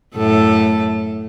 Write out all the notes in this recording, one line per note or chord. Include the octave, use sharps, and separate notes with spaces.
F#2 A2 A4